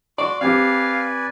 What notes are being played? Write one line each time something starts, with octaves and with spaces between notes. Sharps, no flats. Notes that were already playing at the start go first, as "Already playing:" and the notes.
F#4 D5 C6 C#6
C4 G4 B4 D5 F5 G#5 D6